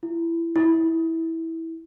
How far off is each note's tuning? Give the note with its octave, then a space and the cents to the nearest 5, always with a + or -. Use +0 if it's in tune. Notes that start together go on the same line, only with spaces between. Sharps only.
E4 +20
E4 -15